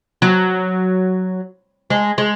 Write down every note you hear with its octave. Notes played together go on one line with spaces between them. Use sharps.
F#3
G#3
G#3